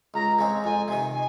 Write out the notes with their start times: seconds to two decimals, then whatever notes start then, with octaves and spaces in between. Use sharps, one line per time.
0.14 C#2 A#5
0.39 C#3 G#3 C4
0.64 F2 G#5
0.88 C3 D#3 G#5
1.14 G#5